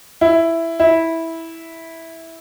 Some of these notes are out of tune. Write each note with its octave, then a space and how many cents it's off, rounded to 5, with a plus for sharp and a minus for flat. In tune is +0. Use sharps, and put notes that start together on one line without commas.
E4 +5
E4 -10